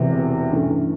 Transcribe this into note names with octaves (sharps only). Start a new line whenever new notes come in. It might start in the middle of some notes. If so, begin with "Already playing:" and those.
Already playing: E1 E2 C3 E3
G2 E3 A3 C#4